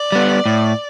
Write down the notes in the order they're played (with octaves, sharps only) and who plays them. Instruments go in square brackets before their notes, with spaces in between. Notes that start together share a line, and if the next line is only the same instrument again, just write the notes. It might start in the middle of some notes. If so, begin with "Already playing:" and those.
Already playing: [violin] D5
[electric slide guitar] G3 B3
A2